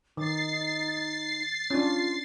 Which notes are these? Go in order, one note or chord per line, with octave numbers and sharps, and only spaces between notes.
D#3 D#4 A6 C7
C#4 D4 F4